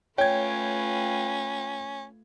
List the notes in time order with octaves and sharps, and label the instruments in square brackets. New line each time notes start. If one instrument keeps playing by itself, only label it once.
[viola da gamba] A3 F4 B4 [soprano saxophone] C#4 [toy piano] C#5 [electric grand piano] G5 G#6